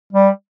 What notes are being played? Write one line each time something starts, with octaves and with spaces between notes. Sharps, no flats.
G3